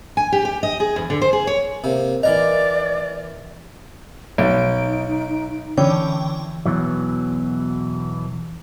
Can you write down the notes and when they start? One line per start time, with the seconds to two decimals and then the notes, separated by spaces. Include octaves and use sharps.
0.17 G#5
0.32 G4
0.45 G4
0.63 D#5
0.80 G#4
0.96 E2
1.10 D3
1.22 C5
1.33 G#4
1.47 C#5
1.84 C3 A#3
2.23 E3 A#4 D5 D#5 A#5
4.38 B1 D#4 D7
5.77 D3 E3 C#4 G5
6.66 E2 B2 E3 F#3